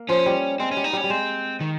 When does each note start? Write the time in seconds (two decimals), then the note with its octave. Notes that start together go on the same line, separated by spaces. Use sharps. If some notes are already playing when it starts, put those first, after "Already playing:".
Already playing: A#3
0.09 F3 C#4
0.26 G3
0.60 G#3 C4
0.71 C#4
0.77 G3
0.84 D#4
0.93 G3 C#4
1.04 G3
1.10 G#3 C4
1.61 D#3